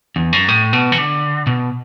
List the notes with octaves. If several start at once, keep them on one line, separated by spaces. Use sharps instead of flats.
E2
F#2
A2
B2
E3
D3
B2